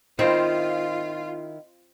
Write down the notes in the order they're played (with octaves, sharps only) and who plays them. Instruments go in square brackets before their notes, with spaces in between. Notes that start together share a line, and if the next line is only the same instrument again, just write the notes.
[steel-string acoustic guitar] D#3 E4 [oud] C4 [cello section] F4